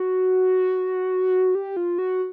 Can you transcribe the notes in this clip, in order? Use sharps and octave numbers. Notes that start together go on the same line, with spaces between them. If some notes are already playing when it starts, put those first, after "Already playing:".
Already playing: F#4
G4
F4
F#4